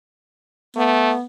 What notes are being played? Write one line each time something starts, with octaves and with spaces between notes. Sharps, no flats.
A3 B3